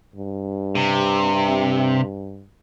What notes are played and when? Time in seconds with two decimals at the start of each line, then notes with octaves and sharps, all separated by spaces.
0.15 G2
0.75 C3